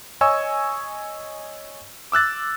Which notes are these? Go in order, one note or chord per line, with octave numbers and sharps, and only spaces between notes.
C#5 D#5 G#5 C#6 E6
D6 E6 F#6 A6